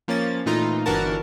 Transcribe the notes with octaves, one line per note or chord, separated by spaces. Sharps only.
F3 A#3 C#4 A6
A#2 E3 A3 D#4 F4 A#5
G1 E3 D4 F#4 A#4 A5